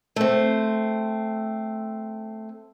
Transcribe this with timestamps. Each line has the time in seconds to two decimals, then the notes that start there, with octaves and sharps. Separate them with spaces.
0.16 A3 C4